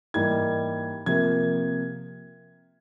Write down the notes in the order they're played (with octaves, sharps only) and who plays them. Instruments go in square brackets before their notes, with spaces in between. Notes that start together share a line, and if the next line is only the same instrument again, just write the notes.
[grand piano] G#2 E3 G3 A#3 G#6
C3 F3 A#3 G#6